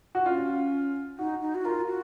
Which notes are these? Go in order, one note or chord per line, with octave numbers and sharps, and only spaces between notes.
F#4
C#4 F4
D#4 F#4
D#4
F#4
F4 A#4
F#4